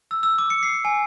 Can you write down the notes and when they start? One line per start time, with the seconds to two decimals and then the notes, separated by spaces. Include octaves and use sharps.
0.11 E6
0.23 E6
0.38 D6
0.50 C#7
0.63 C7
0.85 G#5